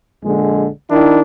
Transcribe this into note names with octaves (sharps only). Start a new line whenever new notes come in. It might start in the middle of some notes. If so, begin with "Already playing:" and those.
A#1 D3 G#3
D#3 D4 E4